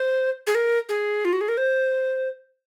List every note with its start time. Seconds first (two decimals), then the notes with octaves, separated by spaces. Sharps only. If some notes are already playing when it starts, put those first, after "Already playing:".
Already playing: C5
0.47 G#4
0.55 A#4
0.89 G#4
1.25 F4
1.33 F#4
1.41 G#4
1.49 A#4
1.57 C5